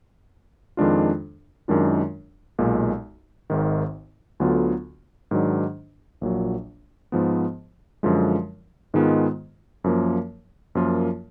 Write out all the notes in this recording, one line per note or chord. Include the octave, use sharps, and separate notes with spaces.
F2 D#3 G#3 D4 F4
F#2 D#3 G#3 D4 F4
B1 A#2 G#3
G#1 G#2 D#3
D2 D3 F#3 B3 F4
G#2 D#3 F#3 D4
A#1 A#2 F#3
G#2 F3 B3
F#2 D3 F3 G#3
G#2 D#3 G#3 B3 F4
F#2 F3 A#3
F#2 F3 A#3 F4